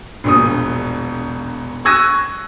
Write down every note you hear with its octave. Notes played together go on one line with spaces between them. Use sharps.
E1 A#1 D#6
C#6 E6 F#6 G#6 A#6 D#7